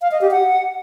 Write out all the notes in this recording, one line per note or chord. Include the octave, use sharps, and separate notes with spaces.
F5
D#5
G4
F#5